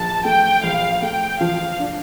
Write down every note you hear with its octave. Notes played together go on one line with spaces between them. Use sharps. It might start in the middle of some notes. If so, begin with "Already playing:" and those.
Already playing: A#1 A5
A3 G5
A#1 F5
A3 G5
F3 F5
D4